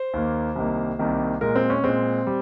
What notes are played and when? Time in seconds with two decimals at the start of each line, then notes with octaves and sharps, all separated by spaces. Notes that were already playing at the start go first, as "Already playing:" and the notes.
Already playing: C5
0.14 D#2 D#3 A#3
0.56 C2 C3 D#3 A#3
0.99 C2 C3 D#3 A#3
1.41 A#2 G#3 A#4
1.56 C4
1.70 C#4
1.84 A#2 G#3 C4
2.27 G3